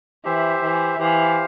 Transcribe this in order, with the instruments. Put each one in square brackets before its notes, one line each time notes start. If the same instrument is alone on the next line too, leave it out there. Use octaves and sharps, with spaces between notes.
[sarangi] E3 [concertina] G4 C5 E5
[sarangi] E3
[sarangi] E3 [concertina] G4 C5 F5